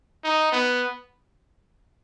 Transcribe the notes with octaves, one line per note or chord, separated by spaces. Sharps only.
D#4
B3